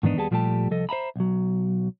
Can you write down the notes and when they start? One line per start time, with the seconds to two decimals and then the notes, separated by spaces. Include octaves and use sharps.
0.03 G#2 D#3 E3 B3 D4 D#4
0.17 D#2 G3 B3 G#4 A5
0.31 A#2 F3 G3 A3 G4 A5
0.71 C2 F3 A4 D#5
0.89 C5 E5 A#5 B5
1.16 B1 F#3